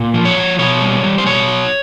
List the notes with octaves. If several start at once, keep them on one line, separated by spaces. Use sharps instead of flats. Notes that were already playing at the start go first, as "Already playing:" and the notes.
Already playing: A#2
F3
C#5
F3
B2 C#5
G3
G3
C5
B2 C#5
F#3